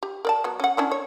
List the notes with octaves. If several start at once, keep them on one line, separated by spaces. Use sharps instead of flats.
G4
A#4 D5 A5
F#3 B3
C#4 F#5
C#4 D4 E4
C#5